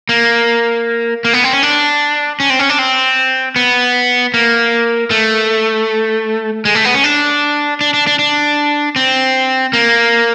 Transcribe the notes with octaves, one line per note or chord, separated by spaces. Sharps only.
A#3
A#3
B3
C4
C#4
D4
C#4
C4
C#4
D4
C4
B3
A#3
A3
G#3
A3
B3
C#4
D4
D4
D4
D4
D4
C4
A#3